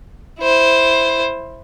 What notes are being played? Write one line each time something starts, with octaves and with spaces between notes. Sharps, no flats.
E4 C5